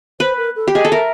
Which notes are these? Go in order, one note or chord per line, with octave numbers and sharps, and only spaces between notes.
B4 C5
A#4
A4
G4
G#4 D#5
A4
A#4 E5